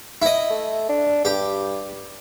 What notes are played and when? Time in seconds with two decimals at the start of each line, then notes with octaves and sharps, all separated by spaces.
0.22 E4 D#5
0.50 A3
0.89 D4
1.25 G2 G4